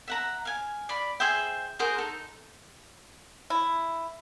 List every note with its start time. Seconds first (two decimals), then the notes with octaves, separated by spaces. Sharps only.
0.08 E5 F#5 A#5
0.45 F5 G#5
0.89 D5 B5
1.20 G#4 C5 E5 G5
1.79 F#4 G#4 A#4 C5
1.98 D#4 A4
3.50 E4